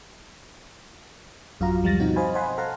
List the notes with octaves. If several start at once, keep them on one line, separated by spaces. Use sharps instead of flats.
A1 F#2 F4 F#4 F5 A#5
D2 F3 G3 F5 A6 A#6
B2 C4 D#4 F#4
C5 D#5 F5 G#5 B5
C5 D#5 F#5 G#5 B5 C6
A4 F5 F#5 A5 A#5 C6